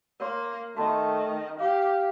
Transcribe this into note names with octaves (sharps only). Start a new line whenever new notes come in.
A#3 A#4 C#5 C6
D#3 A3 F#4 A5
G4 F5 D6